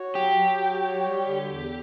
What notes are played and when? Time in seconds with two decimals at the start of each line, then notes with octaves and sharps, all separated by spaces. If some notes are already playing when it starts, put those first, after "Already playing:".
Already playing: F#4 C#5
0.15 F#3 G4
0.37 F#3
0.61 F#4
0.83 C#5
1.04 G3
1.27 D3
1.49 E2